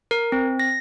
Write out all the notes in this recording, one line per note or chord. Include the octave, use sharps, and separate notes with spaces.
A#4
C4
A#6